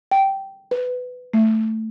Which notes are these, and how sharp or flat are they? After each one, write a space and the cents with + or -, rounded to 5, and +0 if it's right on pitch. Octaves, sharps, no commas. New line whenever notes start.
G5 -10
B4 +15
A3 +5